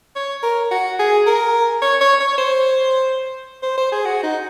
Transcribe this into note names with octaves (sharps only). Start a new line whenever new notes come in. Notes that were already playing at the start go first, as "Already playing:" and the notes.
C#5
A#4
F#4
G#4
A#4
C#5
C#5
C#5
C5
C5
C5
G#4
F#4
D#4